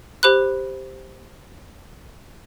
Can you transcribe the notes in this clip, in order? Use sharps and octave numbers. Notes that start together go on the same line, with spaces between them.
G4 C5 B5 F#6